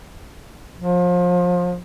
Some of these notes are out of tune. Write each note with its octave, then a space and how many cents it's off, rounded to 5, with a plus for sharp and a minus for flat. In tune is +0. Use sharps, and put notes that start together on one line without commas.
F3 +30